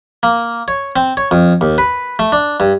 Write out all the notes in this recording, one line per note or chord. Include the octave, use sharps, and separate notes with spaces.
A#3
C#5
C4
C#5
F2
D#2
B4
A3
D4
G2